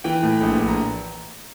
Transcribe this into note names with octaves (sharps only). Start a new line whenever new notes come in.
E3 G5
A2
A#1
A#1
A#5